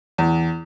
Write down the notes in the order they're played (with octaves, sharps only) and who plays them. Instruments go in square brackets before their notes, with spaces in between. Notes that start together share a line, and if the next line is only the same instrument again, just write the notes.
[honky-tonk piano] E2